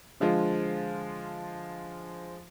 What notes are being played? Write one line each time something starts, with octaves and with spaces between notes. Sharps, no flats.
D3 F3 G#3 F4